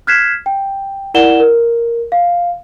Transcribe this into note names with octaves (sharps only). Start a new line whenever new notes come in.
F6 F#6 G#6 B6 C7 E7
G5
E4 A#4 D5 F#5 E7 G7
A#4
F5